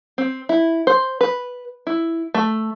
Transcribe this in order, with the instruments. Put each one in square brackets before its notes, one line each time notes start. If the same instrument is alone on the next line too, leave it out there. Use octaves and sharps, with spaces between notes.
[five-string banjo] C4
E4
C5
B4
E4
A3